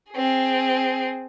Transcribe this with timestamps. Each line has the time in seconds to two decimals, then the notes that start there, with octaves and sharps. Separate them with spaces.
0.12 C4 G#4